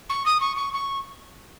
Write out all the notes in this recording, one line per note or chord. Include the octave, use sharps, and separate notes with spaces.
C#6
D#6
C#6
C#6
C#6